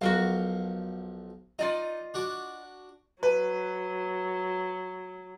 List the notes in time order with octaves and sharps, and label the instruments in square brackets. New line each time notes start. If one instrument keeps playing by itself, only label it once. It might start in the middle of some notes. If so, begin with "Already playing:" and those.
[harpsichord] B1 F3 [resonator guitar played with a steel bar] F#4 A#4 F5
[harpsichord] D#4 [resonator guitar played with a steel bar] F4 D5 D#5
[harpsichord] D4 F#4 D6
[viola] F#3 [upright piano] B4